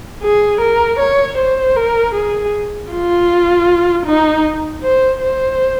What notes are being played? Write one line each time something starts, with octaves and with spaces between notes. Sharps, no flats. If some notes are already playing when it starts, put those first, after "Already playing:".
G#4
A#4
C#5
C5
A#4
G#4
F4
D#4
C5
C5